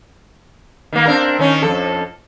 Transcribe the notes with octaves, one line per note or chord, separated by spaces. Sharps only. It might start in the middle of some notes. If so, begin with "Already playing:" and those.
D#3 A#3
C4 D4 A#4
D#3 C#4 D#4
F2 A4